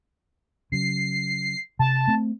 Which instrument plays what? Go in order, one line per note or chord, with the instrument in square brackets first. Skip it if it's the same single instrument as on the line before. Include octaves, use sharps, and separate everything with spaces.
[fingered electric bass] C#3 F#3 [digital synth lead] C7
[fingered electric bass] C3 [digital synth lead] A5
[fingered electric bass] A3 C4